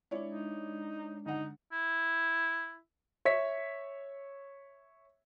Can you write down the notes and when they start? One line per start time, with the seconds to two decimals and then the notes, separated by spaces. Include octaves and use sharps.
0.11 G#3 D4 E4 C#5 D5
0.30 D#4
1.26 D3 D#4 F#5
1.72 E4
3.25 C#5 E5 B6